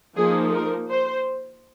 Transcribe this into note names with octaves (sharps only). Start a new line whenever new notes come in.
F3 A#3 D#4 G#4
A#4
C5